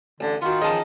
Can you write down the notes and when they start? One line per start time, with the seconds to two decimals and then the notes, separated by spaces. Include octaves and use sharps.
0.20 A1 D3
0.41 D#3 B3 F4 F#4
0.62 C#3 E3 F3 D#5 A5